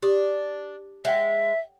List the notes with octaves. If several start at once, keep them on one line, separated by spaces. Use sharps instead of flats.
D4 G4 D#6
G#3 C#5 E5 F#5 G5